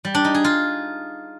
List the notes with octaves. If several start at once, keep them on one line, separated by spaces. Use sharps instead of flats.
G3
D4
D#4
G#4
F4